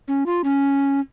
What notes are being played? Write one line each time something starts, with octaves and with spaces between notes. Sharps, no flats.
C#4
F4
C#4